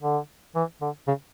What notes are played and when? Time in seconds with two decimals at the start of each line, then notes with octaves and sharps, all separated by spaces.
0.02 D3
0.56 E3
0.81 D3
1.08 C#3